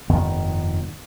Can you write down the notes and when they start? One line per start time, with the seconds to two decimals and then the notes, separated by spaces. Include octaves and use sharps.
0.10 F1 G2 D#3 B3